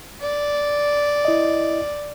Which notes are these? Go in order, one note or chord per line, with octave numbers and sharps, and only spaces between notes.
D5
E4 D#5